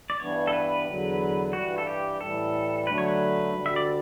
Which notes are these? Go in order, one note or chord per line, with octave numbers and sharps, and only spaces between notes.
D5
G2 E3 G3 B3 D4 C#5
A4
B4
E2 D3 F#3
G2 E3 G3 F#4
A4
G4
A2 E3 G3 A4
D3 F#3 A3 D4 B4
C#5
B4
D2 D3 G3
E5
D5